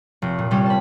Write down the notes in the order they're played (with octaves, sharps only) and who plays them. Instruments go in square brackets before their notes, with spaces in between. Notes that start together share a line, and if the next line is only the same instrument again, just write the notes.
[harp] F1
A#2
C3 G3 C#4
A5 B5